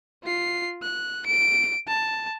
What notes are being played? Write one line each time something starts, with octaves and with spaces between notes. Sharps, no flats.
F4 C7
F#6
D7
A5